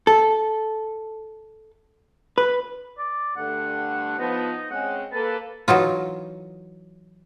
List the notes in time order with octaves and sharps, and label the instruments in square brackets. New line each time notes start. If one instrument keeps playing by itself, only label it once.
[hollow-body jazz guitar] A4
B4
[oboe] D5
[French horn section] G2 D3 A3 [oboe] F#5
[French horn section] F3 B3 [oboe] D#4
[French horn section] G#3 C4 C#4 [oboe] F#5
[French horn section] A#3 A4 B4 [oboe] A5
[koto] E3 F#3 D#4 F4